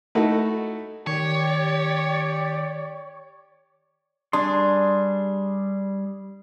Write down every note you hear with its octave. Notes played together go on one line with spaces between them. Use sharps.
A3 D#4 E4 F#4 A4
D#3 G4 C#5 D5
G3 D4 G#4 C6